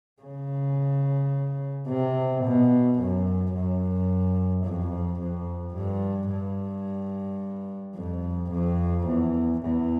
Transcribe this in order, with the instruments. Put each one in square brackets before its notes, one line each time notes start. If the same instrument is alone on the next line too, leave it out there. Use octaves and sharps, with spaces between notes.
[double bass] C#3
C3
B2
F#2
F#2
F2
F2
G2
G2
F2
F2
E2
E2